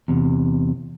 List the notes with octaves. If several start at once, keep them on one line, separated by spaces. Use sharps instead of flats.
E2 C3